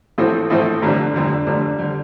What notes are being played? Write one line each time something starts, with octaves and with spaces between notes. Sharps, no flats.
A1 A2 F3 A3 C4
A1 A2 F3 A3 C4
F1 F2 D3 G3
F1 F2 D3 G3
F1 F2 D3 G3
D3 G3